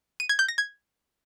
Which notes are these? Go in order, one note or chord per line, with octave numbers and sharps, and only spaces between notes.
D#7
G#6
G6
A#6
G#6